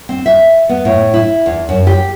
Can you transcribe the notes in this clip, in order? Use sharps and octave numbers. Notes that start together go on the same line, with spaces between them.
C4
E5
B3
A2
E4
E2
F#2
G4